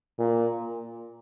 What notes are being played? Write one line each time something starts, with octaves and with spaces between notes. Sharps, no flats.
A#2